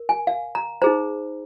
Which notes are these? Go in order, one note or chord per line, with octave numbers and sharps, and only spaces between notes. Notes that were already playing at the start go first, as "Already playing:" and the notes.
Already playing: A#4
G#5
F5
A#5
D#4 G#4 C5 A#5